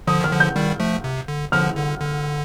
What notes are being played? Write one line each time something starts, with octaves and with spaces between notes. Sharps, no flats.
D3 F3 D#6
D#3 F6
D3 F3
G6
D#3 G3
F3 A3
C3
D3
D3 F3 F6
D3
D3